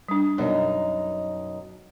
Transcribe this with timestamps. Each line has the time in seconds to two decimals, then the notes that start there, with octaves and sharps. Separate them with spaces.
0.08 G3 D4
0.38 F#2 B2 D#4 A#4